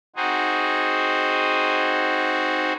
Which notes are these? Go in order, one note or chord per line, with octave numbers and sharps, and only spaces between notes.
C4 D#4 F#4 G#4 C5